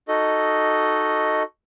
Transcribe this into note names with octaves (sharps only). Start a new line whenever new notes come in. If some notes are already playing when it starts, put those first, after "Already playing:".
D#4 F#4 A4 D#5